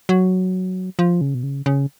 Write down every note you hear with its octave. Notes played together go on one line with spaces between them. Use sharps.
F#3
F3
C#3
B2
C#3
C#3